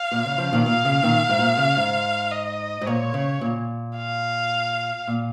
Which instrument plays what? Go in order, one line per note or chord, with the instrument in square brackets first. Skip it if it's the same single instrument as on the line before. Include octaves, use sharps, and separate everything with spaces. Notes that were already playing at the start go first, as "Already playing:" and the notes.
Already playing: [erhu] F5
[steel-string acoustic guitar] A#2
C#3
C#3 F3
A#2 D#3
[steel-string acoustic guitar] A#2 [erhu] F5
[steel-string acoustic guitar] C#3
A#2 D#3
G#2
A#2
C#3
G#2
[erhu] D#5
[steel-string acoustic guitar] G#2
[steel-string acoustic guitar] A#2 [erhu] C#5
[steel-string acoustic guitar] C#3
A#2
[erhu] F5
[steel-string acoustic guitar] A#2